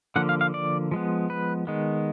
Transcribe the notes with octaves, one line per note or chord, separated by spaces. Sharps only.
D3 F3 A#3 F#5
F5
F5
D5
F3 G#3 B3
B4
D#3 G#3 B3